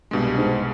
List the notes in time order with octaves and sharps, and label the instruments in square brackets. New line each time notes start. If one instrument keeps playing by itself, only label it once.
[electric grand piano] C2 B2 G#3 [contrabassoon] G2
[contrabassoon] G#2